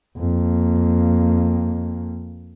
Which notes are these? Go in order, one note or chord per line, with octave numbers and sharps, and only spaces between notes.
F2 A#3